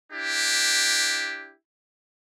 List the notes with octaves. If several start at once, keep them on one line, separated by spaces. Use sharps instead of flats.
D4 E4 G4